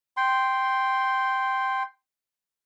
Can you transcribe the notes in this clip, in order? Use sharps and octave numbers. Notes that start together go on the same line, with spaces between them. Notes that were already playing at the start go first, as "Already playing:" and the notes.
G5 C6